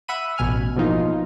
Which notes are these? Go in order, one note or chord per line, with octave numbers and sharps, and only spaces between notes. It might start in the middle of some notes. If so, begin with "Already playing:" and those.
E5 F#5 B5 D#7
A1 B2 G#5 F6
B2 E3 F3 A#3 D#4 F4